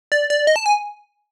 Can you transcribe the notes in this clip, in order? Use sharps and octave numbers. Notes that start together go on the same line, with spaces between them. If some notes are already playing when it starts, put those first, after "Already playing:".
D5
D5
D#5
A5
G#5